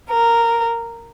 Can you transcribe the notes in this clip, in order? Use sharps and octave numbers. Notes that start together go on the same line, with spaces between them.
A#4